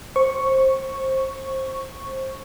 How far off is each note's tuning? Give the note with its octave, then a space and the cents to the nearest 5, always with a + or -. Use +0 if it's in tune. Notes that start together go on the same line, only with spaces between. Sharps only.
C5 +20 C#6 +0